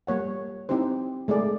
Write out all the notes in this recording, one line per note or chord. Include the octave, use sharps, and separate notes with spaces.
G3 A#3 C#5 F#5
C4 D#4 E4 G4 C5
G#3 A3 G#4 D5